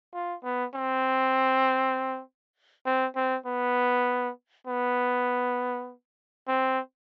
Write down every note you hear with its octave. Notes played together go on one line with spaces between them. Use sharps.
F4
B3
C4
C4
C4
B3
B3
C4